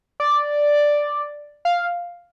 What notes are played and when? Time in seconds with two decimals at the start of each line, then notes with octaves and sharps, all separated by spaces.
0.20 D5
1.65 F5